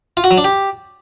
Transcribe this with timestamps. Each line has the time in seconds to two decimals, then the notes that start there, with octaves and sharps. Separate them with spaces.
0.17 F4
0.24 F#4
0.31 F#3
0.38 D4
0.44 G4